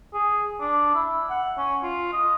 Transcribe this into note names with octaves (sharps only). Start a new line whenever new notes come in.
G#4
D4
E4
F#5
C#4
F4
D#5